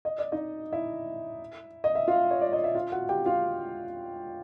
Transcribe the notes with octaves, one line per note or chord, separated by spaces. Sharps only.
D#5
D5
D#4 D#5
E4 E5
D#5
E5
F4 F5
C#5
D5
D#5
E5
F4 F5
F#4 F#5
G4 G5
F4 F5